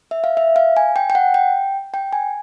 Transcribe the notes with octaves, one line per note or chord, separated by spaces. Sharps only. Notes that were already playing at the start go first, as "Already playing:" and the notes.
E5
F5
E5
F5
G#5
G5
G5
F#5
G5
G5
G#5